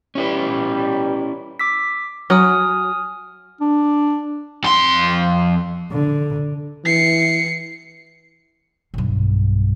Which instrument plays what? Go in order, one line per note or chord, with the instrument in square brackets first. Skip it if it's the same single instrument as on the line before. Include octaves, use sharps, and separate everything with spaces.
[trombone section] B2 G3 [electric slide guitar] C#4 E4 B4
[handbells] D6 E6 B6
[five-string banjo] F#3 [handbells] G#5 D#6 F6
[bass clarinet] D4
[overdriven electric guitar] F2 C6
[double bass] D3
[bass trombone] E3 [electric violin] C7 C#7
[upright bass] B1 G2